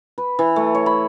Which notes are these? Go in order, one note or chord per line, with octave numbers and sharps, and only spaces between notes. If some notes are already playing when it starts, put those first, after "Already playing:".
B4
E3
A3
C#5
B5